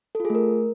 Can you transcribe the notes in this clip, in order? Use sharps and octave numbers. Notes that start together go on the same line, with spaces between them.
A4
F4
G#4
A3
A#4